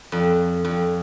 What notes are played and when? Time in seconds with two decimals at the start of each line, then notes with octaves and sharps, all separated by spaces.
0.12 F2
0.65 F2